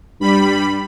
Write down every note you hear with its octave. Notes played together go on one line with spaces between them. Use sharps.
G2 G3 B5